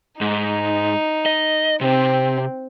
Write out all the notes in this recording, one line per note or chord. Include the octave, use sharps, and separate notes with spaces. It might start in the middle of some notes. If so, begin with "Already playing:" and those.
G#2 D#4
D#5
C3 C4